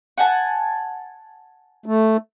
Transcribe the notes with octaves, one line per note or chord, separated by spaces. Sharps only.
F#5 G#5 A5
A3